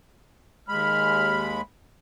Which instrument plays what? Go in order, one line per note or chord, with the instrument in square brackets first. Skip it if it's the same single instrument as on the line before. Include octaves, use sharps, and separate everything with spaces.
[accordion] D#2 G#3 B5 [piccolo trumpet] F6